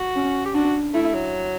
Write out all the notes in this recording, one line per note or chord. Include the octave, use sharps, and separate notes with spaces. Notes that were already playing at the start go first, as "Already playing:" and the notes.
Already playing: F#4
C#4
G4
D4 F#4
A3 E4
F#3